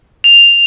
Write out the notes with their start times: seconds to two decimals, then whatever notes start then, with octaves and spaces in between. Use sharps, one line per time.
0.24 F7